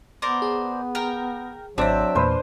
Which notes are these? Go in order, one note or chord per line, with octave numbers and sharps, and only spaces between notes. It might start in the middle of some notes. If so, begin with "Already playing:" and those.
B3 A#4 C5 D5
G#4
A#4 G5
G#1 F#3 C4 D4 C5 D5 E5
E2 A#2 B4 C5 C6